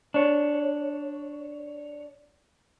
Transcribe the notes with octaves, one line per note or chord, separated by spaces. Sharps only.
D4 C#5